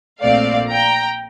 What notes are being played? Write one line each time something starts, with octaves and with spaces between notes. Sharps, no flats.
A#1 A#2 A3 C4 D5 F5
G5 A#5